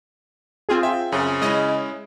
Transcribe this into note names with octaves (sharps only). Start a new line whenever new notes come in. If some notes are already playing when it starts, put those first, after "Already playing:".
C4 F4 G#4
E5 G5
F#2 C#3
G#3 C#4 E4 D#5